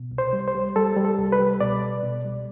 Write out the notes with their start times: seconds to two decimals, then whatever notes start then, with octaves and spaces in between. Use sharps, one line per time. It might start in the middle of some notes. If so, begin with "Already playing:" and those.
Already playing: B2
0.11 C2
0.18 C5
0.33 G3
0.48 C5
0.55 G3
0.76 G3 A4
0.96 G3
1.05 A4
1.18 C2
1.32 B4
1.40 G3
1.60 B2 D5
1.83 C2
2.03 B2
2.25 G3